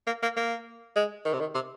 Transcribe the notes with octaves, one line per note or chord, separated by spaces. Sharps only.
A#3
A#3
A#3
G#3
D#3
C3
D#3
C3